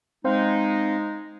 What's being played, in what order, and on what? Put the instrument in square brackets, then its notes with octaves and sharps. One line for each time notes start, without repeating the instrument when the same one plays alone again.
[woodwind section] G#3 D#4 [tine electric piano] C4 C5 F5